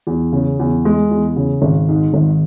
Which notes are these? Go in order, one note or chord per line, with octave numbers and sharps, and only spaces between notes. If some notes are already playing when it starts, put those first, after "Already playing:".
E2
C#3
E2
G#3
E2
C#3
G#1
G#2
G#1